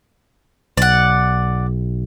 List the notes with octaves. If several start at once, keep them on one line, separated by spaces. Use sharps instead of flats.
B1 D5 F#5